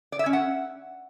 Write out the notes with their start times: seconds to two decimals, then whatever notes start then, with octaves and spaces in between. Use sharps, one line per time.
0.12 D5
0.19 E5
0.26 C#4
0.33 F#5